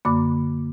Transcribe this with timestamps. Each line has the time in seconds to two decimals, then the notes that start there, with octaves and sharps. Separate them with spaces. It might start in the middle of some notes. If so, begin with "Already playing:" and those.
0.05 F#2 D3 A#3 B5 D6